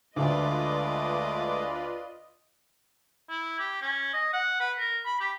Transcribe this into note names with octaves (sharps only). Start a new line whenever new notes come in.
D2 G#3 A3 F4 B4 D5 D#5 D6
E4
G4
C#4
D#5
F#5
B4
A#4
B5
G4